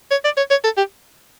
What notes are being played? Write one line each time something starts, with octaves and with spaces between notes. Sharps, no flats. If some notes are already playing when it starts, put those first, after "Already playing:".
C#5
D5
C#5
C#5
A4
G4